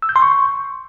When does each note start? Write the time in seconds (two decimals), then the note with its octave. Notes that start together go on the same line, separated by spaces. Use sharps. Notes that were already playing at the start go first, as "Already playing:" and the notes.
0.02 E6
0.09 G6
0.16 C6
0.22 C#6